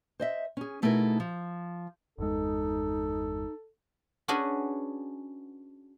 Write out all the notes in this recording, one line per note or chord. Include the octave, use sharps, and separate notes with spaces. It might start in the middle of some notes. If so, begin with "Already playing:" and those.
C5 D#5 E5
C#4 G#4
B2 A3 D#4 E4 G#4 A#4
F3
G1 E2 G#3 D#4 A4
C#4 D4 F#4 G#4 B4